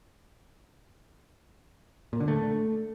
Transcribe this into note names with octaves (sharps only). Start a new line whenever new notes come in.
A#2
D3
A3